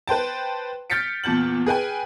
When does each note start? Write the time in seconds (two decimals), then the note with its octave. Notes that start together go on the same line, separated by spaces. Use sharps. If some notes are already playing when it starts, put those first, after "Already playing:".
0.07 B4 C5 G5 A5
0.90 F6 G6 A6 B6 C#7 D7
1.24 E2 A#2 A5 G6 F#7
1.66 G#4 B4 G5 G#5